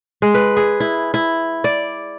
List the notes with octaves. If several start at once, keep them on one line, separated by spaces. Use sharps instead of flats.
G#3
B4
G#4
E4
E4
D5